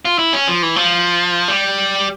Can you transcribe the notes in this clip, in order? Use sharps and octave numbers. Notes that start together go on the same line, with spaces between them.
F4
E4
C#4
F3
E3
F3
G3